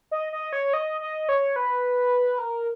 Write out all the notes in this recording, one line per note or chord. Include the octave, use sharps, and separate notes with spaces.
D#5
D#5
C#5
D#5
D#5
C#5
B4
A#4